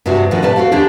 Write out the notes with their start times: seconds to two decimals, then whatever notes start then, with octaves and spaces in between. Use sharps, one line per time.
0.06 G2 C3 G#3 C4 F#4
0.31 B2 D3 D#3 F3 G#3 A4
0.42 A2 C3 G3 B4 G#5 A5
0.56 C4 F#4 A4 F5
0.72 D#2 B2 D3 D4 G4 G#4